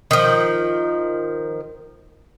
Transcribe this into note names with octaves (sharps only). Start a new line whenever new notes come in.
D#3 F3